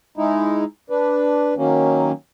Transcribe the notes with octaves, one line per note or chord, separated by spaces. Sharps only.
G#3 D#4 E4
D4 B4
D#3 F#3 A#3 C#4